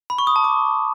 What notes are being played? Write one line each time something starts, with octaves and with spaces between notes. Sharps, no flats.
B5
C#6
D#6
A5
D6